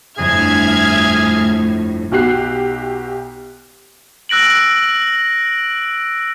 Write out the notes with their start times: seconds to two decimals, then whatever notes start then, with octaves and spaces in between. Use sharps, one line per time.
0.18 G1 F2 A2 G#4 E5 F6 G#6
2.12 B1 F#4 G4 F#6 C7
4.29 E6 F#6 A#6 D7 F#7